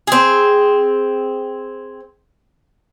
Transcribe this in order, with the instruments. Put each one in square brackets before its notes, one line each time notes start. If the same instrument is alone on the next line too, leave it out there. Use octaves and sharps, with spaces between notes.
[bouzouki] C4 G#4